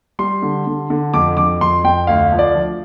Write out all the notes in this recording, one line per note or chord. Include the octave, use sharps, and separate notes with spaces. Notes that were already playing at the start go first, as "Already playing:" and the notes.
G3 C6
D3
D3
D3
F2 D6
F2 D6
F2 C6
F2 G5
D2 F5
F3
D5
F3